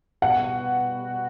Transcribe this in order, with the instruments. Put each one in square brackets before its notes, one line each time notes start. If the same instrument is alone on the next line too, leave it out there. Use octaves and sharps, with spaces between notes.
[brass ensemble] B2 G3 B3 F#4 [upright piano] F#5